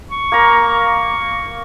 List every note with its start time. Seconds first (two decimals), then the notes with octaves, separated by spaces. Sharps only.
0.11 C#6
0.32 A#3 A#5